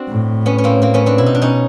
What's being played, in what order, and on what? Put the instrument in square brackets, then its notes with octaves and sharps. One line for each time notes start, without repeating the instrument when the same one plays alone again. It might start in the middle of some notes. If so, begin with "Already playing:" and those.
Already playing: [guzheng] C4 D4 F#4
[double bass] A2
[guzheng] B3 C#4
C#4
A#3 C4
A#3 C4
B3 C#4
C4 D4
[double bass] B2 [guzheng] E4
[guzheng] D#4
D4
C#4 D#4